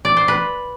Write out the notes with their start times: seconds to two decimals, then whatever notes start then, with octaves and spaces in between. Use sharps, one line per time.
0.05 D5
0.17 C5
0.28 B4